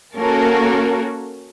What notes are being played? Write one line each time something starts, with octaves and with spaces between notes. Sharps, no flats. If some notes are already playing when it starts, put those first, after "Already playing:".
A#3 C#4 F#4 A4 A#4